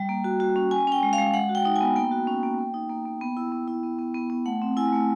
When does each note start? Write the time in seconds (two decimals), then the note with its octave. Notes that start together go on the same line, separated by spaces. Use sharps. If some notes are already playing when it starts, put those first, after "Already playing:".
Already playing: G3 G5
0.09 A#3
0.24 F#4
0.40 F#4
0.56 C#4
0.71 C#4 G#5
0.87 C#4 G5
1.03 G#3
1.13 F5
1.18 G#3
1.34 G#3 F#5
1.49 F#4
1.55 G5
1.65 D#4
1.76 B3 G#5
1.96 A#3 G5
2.11 F#4
2.27 C#4
2.43 A#3
2.58 A#3
2.74 D#4
2.90 A#3
3.06 A#3
3.21 B3
3.37 E4
3.52 B3
3.68 E4
3.83 B3
3.99 B3
4.15 B3
4.30 B3
4.46 A3 F#5
4.62 C4
4.77 E4 G#5
4.92 A3